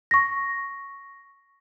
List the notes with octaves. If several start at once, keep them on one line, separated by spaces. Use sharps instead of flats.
C#6 A#6